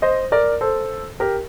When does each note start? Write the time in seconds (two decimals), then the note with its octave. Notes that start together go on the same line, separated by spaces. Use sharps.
0.02 C5 D#5
0.32 A#4 D5
0.61 A4 C5
1.20 G4 A#4